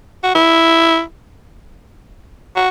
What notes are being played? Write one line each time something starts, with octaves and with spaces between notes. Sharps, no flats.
F#4
E4
F#4